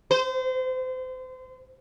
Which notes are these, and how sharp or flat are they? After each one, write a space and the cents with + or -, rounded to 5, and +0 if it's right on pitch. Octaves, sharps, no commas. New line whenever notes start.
C5 -30